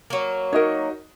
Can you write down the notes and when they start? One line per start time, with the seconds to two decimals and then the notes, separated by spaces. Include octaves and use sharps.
0.10 F#3 A#3
0.53 D#4 F#4 A#4 C#5 D#5